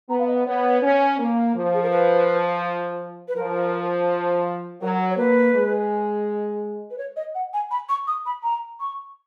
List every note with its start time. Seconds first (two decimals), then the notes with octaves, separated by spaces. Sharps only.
0.09 B3 A#5
0.19 F5
0.28 D#5
0.46 B3 C#5
0.82 C#4
1.19 A#3
1.55 F3
1.74 G#4
1.82 A#4
1.91 B4
3.28 B4
3.36 F3 A#4
4.82 F#3 A#4
5.11 C#5
5.17 A#3 B4
5.54 G#3
6.91 B4
6.98 C#5
7.17 D#5
7.35 F#5
7.54 G#5
7.71 B5
7.89 C#6
8.07 D#6
8.26 B5
8.43 A#5
8.80 C#6